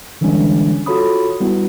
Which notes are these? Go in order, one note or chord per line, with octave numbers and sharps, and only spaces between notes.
D3 E3 G3 G#3 C#4 D4
F4 F#4 A4 C#5 B5 D#6
G3 B3 E4 F#4